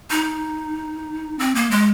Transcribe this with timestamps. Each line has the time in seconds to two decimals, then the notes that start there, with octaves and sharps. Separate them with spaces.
0.10 D#4
1.39 C4
1.55 A#3
1.71 G#3